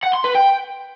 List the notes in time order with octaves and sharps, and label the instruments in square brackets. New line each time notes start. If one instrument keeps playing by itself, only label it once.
[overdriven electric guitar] F#5
C6
B4
G5